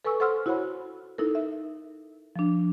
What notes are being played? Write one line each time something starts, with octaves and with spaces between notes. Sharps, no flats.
A4 B4 G#5 C#6 E6
A4 C5 F#5 C6 E6 F6
E4 F#4 C5 C#5 F#5 B5
D#4 E4 A4 A#4
E5
F3 D4